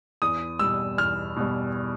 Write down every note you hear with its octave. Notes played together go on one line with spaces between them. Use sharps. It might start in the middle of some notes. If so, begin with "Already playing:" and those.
E2 D#6
B2 G3 E6
E2 F6
B2 G3